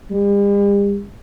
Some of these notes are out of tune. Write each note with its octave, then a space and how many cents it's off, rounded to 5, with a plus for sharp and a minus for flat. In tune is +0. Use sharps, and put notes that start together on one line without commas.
G3 +45